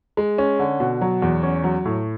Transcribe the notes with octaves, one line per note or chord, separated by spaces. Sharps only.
G#3
C#4
D3
B2
F#3
E2
C#4
F#3
A2